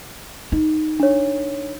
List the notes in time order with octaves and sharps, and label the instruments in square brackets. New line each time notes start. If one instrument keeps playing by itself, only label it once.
[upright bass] D#4
[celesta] D4 C#5